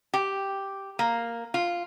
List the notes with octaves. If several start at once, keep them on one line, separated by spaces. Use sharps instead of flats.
G4
A#3
F4